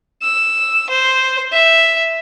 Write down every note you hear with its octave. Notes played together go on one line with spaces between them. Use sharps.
E6
C5
E5